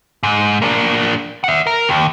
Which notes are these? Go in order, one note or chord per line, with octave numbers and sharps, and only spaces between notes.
G#2
A#3 D4
E5 F#5
A#4
D#2